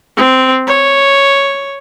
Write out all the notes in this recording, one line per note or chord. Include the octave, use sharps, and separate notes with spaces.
C4
C#5